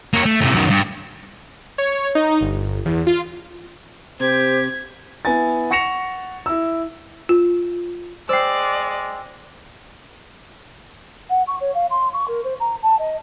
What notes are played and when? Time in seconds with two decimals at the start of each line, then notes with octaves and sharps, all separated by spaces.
0.13 A#3 C#5
0.26 A3
0.41 A2 C3
0.54 F#2 D#3
0.70 G2
1.78 C#5
2.15 D#4
2.41 G1
2.86 E2
3.07 F4
4.20 C3 G4 C5 G#6
5.25 B3 E4 G#5 A6
5.70 F#5 C#6 A#6 C#7 E7 F7
6.46 E4 E6
7.29 F4
8.29 G#3 C5 D5 G5 E6 C7
11.29 F#5
11.47 C#6
11.60 C#5
11.74 F5
11.90 C6
12.13 C#6
12.28 A#4
12.44 C5
12.60 A#5
12.82 A5
12.99 D#5